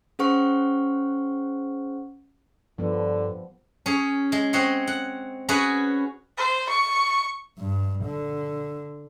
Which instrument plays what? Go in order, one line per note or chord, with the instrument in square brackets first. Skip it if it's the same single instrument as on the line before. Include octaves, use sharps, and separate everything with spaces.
[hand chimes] C#4 G#4 C5 F#5 C#6 F6
[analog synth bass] G2 [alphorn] D3 [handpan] F3 G3 B3
[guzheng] C#4 G#4
G#3
C4 C#5 D#5 F#5 C6
F#5
C#4 F#4 G#4 B4 F#5 G#5
[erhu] C5
C#6
[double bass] G2
D3